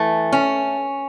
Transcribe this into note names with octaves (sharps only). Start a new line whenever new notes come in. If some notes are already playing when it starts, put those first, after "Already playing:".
Already playing: E3 A3
C#4